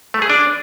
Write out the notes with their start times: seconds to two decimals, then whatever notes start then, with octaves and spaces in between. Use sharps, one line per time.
0.14 A3
0.22 G#4
0.30 D4